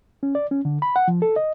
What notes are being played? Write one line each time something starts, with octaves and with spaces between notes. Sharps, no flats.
C#4
D5
C#4
D3
B5
F#5
F3
A4
D#5